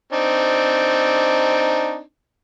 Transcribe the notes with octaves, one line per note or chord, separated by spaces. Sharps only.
C4 D4 D#4